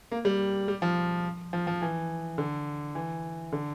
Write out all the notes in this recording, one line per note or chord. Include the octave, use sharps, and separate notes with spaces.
A#3
G3
G3
F3
F3
F3
E3
D3
E3
D3